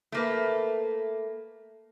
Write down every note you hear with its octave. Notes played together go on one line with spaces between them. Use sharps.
A3 A#3 B4